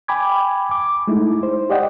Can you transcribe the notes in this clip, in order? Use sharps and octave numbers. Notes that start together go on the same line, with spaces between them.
G5 G#5 B5 D6 G#6
D6
G#3 A3 D#4 E4
C5
G4 D5 D#5 F#5 G5